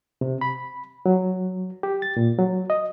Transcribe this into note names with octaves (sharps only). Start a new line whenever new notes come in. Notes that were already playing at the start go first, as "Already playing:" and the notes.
C3
B5
F#3
G4
A6
A#2
F#3
D#5